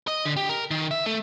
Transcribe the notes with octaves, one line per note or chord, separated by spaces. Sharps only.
D#5
D3
G4
A#4
D#3
E5
A3